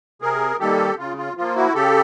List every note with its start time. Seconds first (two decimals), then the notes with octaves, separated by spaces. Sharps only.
0.21 C3 G#4 A#4
0.60 D#3 G3 A#3 G4 A4
0.98 C#3 F4
1.17 F4
1.37 F3 A#3 F4
1.56 E4 F#4
1.74 C#3 G4 A4